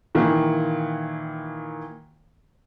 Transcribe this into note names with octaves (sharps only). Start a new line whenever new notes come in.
A#2 D#3 E3